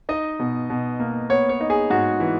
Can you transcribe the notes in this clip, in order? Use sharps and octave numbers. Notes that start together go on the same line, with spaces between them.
D#4 D#5
B2
B2
A#3
B3 C#5
C#5
D#4
G#4
G#2 F#4
E3